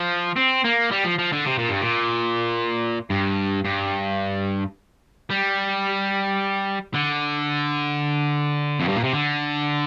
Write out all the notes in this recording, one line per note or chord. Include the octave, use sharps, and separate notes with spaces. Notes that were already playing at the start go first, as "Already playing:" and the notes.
Already playing: F3
C4
A#3
G3
F3
F3
D3
C3
A#2
G2
A#2
G2
G2
G3
D3
F2
G2
A#2
C3
D3